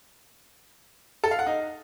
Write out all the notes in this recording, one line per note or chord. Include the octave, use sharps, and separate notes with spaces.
A4
F5
F#5
D#4